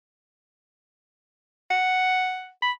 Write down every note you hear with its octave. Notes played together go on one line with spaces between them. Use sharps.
F#5
B5